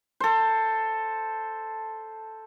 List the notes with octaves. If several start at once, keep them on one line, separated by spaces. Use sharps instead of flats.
A4 C5